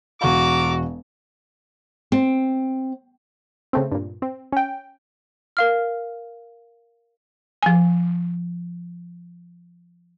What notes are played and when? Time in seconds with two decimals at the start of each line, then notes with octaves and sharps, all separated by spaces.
0.21 E1 F#4 A4 F5 A#5 D6
2.12 C4
3.73 C#3 A3 C4
3.92 G2 A#2
4.22 C4
4.52 C#4 G5
5.57 A#4 F5 F6
7.63 F3 G#5